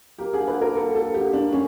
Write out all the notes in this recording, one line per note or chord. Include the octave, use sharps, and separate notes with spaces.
A#3 G4
D3 G#4
D3 B4
A#3 A#4
G3 A4
D3 A4
G3
G4
D3
A#3 D4
A2 C#4